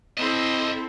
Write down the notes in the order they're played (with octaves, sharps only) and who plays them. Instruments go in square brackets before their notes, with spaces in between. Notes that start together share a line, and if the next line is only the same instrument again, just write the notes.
[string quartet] C4 E4 A4 [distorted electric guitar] D#5 E5